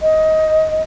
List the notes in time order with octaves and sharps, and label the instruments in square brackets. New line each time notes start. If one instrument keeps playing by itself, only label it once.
[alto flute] D#5